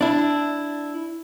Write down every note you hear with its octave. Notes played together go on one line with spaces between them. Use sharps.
D4 E4